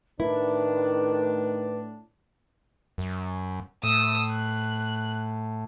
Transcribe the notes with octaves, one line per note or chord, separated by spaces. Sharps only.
A2 D#3 D4 E4 B4
F#2
A2 D#6 E6
F#6